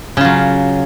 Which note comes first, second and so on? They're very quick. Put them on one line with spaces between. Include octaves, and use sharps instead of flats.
C#3 F4 F#3